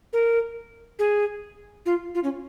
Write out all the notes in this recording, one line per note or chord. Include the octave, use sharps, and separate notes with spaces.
A#4
G#4
F4
F4
C#4